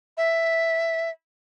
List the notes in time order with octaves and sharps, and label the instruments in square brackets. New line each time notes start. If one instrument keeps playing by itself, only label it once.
[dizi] E5